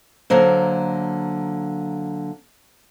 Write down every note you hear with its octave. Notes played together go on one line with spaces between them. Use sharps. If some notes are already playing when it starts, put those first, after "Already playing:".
D3 F#3 A#3 C5